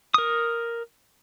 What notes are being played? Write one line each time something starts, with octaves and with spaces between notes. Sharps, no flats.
A#4 D#6